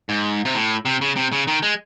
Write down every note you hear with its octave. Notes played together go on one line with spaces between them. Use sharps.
G#2
C3
A2
C3
C#3
C3
C#3
D#3
G#3